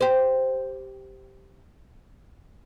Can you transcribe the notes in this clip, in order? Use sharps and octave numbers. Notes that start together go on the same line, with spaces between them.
G4 C5